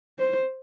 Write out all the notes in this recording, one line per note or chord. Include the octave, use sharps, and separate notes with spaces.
C5